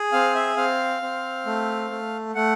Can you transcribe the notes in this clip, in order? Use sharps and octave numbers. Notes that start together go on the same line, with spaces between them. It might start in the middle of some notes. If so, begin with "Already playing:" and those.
Already playing: G#4
C4 F5
E5
C4 F5
C4
A3
A3
A3 F#5